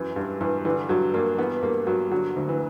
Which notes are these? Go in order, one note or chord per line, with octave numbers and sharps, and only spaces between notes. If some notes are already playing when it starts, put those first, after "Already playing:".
Already playing: F#2 E3
G2
G2 E3
D3 E3
G2 F#3
G2 A#3
E3 B3
G2 A#3
G2 F#3
D3 F#3
D2
E3